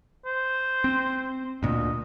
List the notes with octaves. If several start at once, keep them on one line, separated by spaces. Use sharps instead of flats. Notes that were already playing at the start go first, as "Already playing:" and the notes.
C5
C4
D2 A#2 D#5